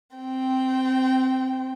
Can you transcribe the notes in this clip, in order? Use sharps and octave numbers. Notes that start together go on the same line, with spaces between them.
C4 G5